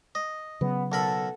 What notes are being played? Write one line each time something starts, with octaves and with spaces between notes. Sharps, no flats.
D#5
C#3 F#3 B3
B1 A4 A#4 F#5 A5 B5 E6